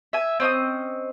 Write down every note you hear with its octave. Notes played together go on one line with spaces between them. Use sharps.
E5 G#5
C4 C#4 D#5 D#6